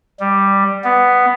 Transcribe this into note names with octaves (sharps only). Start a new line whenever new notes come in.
G3
B3